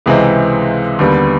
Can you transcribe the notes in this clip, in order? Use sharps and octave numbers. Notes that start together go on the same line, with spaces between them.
C#2 C3 E3 G#3 C4
D#2 D3 G3 B3